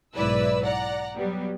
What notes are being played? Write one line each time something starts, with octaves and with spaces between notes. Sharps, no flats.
B1 G#2 E4 B4 D5 E6
D5 F#5 A#5
F#3 G3 B3